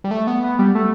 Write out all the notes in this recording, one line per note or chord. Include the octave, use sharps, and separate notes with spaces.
G3
A3
B3
B3
G3
A3